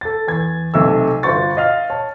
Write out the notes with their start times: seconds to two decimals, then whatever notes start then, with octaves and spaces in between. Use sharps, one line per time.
0.01 A4 A6
0.28 E2 G#6
0.74 B1 C3 A3 E6
1.23 G1 F4 F#4 C5 C#6 A6
1.57 D#5 F5 F6
1.90 C#5 A5